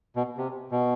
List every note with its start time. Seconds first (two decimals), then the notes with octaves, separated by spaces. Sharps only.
0.16 B2
0.38 C3
0.71 B2